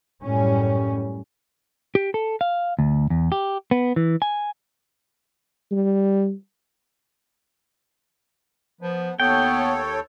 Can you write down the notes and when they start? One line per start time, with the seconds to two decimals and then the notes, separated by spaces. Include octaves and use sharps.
0.24 F#2 A2 G3 C#4
1.95 G4
2.14 A4
2.41 F5
2.79 D2
3.10 E2
3.32 G4
3.71 B3
3.96 E3
4.22 G#5
5.71 G3
8.81 F3 B3
9.20 D#2 B3 A4 C#5 G5